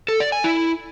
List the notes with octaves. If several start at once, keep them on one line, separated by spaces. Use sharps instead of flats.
A4
D5
G#5
E4